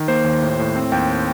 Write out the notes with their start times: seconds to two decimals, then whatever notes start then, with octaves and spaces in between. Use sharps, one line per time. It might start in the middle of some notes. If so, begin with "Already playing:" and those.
Already playing: D#3
0.08 A#3 C5
0.25 D#2
0.42 A2
0.59 A2
0.76 C4
0.92 D#2 G5